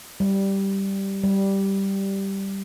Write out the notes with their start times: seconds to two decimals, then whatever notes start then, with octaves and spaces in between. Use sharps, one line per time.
0.20 G3
1.23 G3